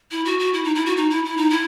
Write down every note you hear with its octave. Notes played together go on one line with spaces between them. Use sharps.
E4
F#4
F#4
E4
D#4
E4
F#4
D#4
E4
E4
D#4
E4